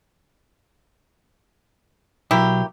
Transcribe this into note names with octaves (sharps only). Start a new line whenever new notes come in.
B1 F#3 A#3 E4 G4